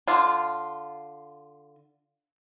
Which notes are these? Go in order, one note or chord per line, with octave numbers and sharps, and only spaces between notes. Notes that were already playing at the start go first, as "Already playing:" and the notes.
D3 F4